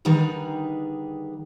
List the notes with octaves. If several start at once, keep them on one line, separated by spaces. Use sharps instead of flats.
D3 D#3 G3 D#4 G#4 B4